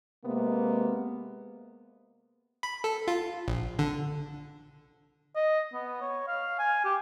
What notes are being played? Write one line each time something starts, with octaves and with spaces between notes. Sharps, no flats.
C3 G#3 A#3 B3
B5
A4
F4
A#1
D3
D#5
B3
C#5
F5
G#5
G4